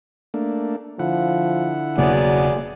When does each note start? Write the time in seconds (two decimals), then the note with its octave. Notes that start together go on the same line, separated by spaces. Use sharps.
0.34 A3 A#3 D4
0.99 D3 F3 E4 F#5
1.98 E1 C#3 F#3 A#3 B3 G#4 D5